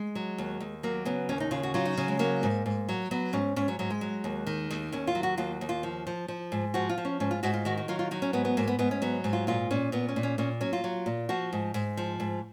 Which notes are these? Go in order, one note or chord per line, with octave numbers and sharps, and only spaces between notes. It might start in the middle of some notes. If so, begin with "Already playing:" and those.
Already playing: G#3
F#3
D#2
D#2
F#3 A#3
C#3 B3
D#2 C#4
D#4
C#3 F4
F#4
F#3 F4
D#4
C#3 C#4
G#3
F#3 A#3
G#2
G#2
F#3
F#3 B3
G#2 C#4
G#2 C#4
F#3
G#2 F#3
G#3
F#3
D#2
D#3
D#2
D#2 C#4
F4
F#3
F#4
D#2 F4
D#2
F4
F3
F3
F3
G#2
F3 F#4
F4
F3
C#4
G#2 C#4
F4
G#2 F#4
F4
D#3 F#4
F#4
F#3 F4
F4
F#3 D#4
C#4
G#2 B3
B3
G#2 A#3
B3
G#2 B3
C#4
F#3 B3
G#2
F4
A#2 F4
A#2 C#4
A#2 B3
C#4
A#2
C#4
A#2 C#4
F#3 C#4
F4
F#3
A#2
F3 F#4
G#2
G#2
F3
G#2